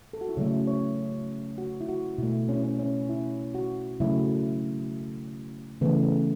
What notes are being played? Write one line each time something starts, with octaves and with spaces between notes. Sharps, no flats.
A4
F#4
E4
C#3 F#3 A3 C#4
C#5
F#4
E4
F#4
B2 A3 E4
C#4
E4
C#4
C#4
E4
F#4
C#3 F#3 A3 E4
C#3 E3 A3 B3